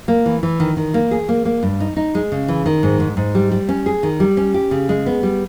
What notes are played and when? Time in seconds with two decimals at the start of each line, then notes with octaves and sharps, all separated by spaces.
0.08 A#3
0.26 E3
0.43 E3
0.60 D#3
0.77 D#3
0.94 A#3
1.11 G#4
1.29 A#3
1.45 A#3
1.63 G2
1.80 D#4
1.97 D#4
2.15 G#3
2.32 C#3
2.48 E3
2.66 D#3
2.83 G#2
3.00 G#2
3.17 G#2
3.35 G3
3.52 G3
3.69 C#4
3.86 G#4
4.03 D#3
4.20 G3
4.37 C#4
4.54 G4
4.71 C#3
4.89 G#3
5.06 B3
5.23 G3